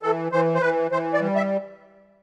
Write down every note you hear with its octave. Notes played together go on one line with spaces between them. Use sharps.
E3 A4
E3 C5
C5
E3 B4
E3 C5
D5
G3
E5